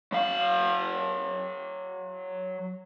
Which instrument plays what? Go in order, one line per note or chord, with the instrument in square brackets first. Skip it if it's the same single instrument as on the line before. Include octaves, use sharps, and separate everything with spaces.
[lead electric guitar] F#3 F5